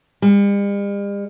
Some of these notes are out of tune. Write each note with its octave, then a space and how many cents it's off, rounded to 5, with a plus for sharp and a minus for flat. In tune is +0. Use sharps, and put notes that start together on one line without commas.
G3 +45